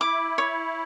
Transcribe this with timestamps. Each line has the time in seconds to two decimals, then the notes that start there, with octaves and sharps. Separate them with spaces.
0.01 E4 D6
0.38 C#5